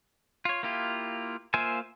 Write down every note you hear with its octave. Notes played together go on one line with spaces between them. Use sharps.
F4 C#5
A#3 E4 F4 G4
A#3 F4 C5 E5 G#5